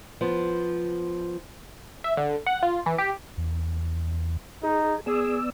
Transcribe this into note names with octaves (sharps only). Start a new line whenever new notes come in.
F3 B3
E5
D3
F#5
F4
E3
G4
E2
D#4 G#4
B3 G#4 D5 E6